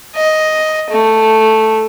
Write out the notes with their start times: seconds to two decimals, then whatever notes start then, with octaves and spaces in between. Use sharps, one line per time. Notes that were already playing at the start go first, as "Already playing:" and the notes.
0.16 D#5
0.90 A3